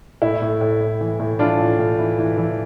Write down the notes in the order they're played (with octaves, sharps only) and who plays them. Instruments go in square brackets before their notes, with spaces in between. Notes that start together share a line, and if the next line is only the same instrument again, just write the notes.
[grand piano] A2 E4
A2
A2
A2
E3
A2
E3 D4 F4
A2
A2
E3
E3
E3